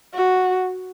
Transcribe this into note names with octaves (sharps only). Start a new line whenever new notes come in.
F#4